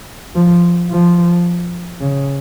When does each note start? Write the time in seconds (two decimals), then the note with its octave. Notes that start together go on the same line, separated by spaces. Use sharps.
0.35 F3
0.91 F3
2.01 C#3